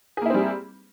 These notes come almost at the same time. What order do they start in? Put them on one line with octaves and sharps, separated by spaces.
G#4 A#3 E4 C4 G3